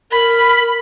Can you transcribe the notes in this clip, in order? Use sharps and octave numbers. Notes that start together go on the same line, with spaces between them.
A#4 B5